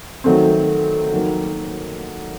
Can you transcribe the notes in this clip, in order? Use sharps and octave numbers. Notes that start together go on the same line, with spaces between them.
D#3 F#3 A3 C4
D#3 F#3 A#3